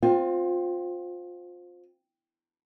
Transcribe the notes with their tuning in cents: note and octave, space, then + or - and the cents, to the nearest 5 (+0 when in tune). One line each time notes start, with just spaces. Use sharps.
C4 +0 F4 +25